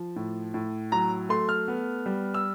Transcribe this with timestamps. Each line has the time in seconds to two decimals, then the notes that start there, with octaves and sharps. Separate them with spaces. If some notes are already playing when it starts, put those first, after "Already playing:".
Already playing: F3
0.16 A2
0.54 A2
0.92 F#3 A#5
1.29 A3 C6
1.49 F6
1.68 B3
2.06 G3
2.34 E6